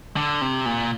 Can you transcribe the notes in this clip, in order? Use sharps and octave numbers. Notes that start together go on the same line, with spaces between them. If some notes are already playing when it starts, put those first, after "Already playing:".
D3
C3
A#2